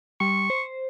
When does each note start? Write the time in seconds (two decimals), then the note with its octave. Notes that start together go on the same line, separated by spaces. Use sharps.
0.21 G3 C#6
0.50 C5